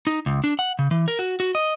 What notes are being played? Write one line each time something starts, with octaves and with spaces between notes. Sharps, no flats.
D#4
C#2
D4
F#5
C#3
E3
A#4
F#4
F#4
D#5